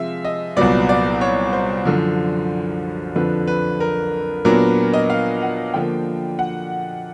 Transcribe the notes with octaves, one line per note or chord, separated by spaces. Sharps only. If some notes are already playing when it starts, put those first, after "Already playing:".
Already playing: C3 F3 G#3 C4 E5 F5
D#5
C2 A#2 F#3 B3 D5
D5
C#5
C5
F#2 D3 F3
F2 D3 F3 B4
B4
A#4
A#2 F#3 B3 D4 A#4
D#5
F5
F#5
D3 F3 A#3 G5
F#5